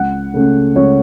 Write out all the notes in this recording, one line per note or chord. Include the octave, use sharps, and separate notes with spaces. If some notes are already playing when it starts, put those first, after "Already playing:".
Already playing: C#2 F#5
C#3 A3 C#4
C#2 C#5